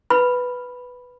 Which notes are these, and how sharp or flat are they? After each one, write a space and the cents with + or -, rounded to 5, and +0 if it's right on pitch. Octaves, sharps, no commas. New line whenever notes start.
B4 +0 B5 +0